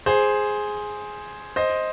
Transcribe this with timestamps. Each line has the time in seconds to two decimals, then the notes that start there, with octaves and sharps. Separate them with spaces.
0.06 G#4 C5
1.56 C5 D#5